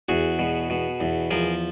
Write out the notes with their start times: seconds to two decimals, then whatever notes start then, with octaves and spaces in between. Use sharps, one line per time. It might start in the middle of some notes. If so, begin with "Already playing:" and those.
0.09 E2 F#4 G#4
0.39 B2
0.70 B2
1.00 E2
1.31 F3 G#4 A#4